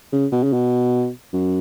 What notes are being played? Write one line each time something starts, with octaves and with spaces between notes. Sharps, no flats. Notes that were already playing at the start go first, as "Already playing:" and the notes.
C#3
B2
C#3
B2
F#2